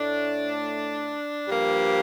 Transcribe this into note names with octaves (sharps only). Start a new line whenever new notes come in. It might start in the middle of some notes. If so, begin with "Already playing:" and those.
Already playing: A2 A3 D4
G2 F3 A#3 G4